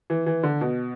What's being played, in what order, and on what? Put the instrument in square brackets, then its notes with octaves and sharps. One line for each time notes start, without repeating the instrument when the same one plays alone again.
[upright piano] E3
E3
D3
B2